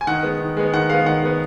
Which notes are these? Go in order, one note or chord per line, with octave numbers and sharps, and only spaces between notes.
G#5
D#3 F#5
G#3 B3
D#3
G#3 B3
D#3 F#5
G#3 B3 F5
D#3 F#5
G#3 B3